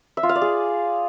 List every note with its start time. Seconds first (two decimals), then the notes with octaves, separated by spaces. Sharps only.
0.17 E5
0.23 F4
0.29 F5
0.35 D5
0.42 G#4